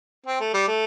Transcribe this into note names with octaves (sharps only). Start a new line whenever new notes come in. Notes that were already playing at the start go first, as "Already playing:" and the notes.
C4
A3
G3
A3